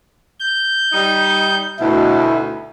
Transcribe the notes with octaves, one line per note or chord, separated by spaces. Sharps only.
G6
G3 D#4
D2 B2 E4